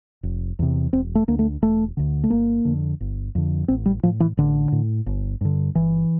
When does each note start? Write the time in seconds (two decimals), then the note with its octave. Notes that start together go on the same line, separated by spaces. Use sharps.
0.23 F1
0.59 E2 C3
0.93 E1 C4
1.15 A3
1.28 D2 D3 A#3
1.39 A3
1.62 E1 A3
1.97 D2 D3
2.24 A3
2.30 G1 A#3
2.65 F2 D3
3.01 G1
3.35 F2 D3
3.68 A1 C4
3.86 G3
4.03 A2 F3
4.20 E3
4.37 A1 D3
4.72 A2
5.06 G1
5.41 G2 D3
5.75 G1 E3